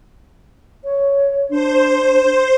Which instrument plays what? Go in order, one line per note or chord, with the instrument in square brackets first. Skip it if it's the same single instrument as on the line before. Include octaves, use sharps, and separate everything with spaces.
[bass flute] C#5
[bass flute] D4 [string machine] C5